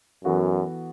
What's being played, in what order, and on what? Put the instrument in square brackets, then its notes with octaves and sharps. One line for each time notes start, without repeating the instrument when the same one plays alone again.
[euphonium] F#2 [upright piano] E3 B3 F#4 A4